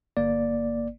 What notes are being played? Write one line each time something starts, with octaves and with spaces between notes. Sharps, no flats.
G1 A#3 D5